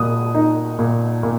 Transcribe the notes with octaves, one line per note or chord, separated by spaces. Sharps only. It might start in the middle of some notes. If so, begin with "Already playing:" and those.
Already playing: A#2 D#6
D#4
A#2
A#2